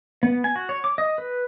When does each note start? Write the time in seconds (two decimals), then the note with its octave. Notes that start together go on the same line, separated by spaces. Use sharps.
0.23 B3
0.44 G#5
0.56 F#4
0.69 C#5
0.84 D6
0.98 D#5
1.18 B4